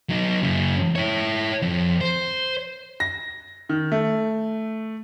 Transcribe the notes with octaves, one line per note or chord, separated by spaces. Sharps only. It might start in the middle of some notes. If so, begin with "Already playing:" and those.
F#3 D#4
F#2 C#3
E4 C#5
F2
C5
A#6
D#3
A3